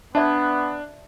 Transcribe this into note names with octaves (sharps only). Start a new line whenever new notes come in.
B3 D4 D5 E5 A5